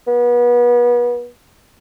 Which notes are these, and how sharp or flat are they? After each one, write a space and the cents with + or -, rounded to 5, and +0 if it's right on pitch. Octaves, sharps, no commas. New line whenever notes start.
B3 -30